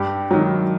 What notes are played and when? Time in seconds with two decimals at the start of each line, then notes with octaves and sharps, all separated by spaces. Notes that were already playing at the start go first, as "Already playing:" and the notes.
Already playing: G2 G4
0.31 D#3 F#3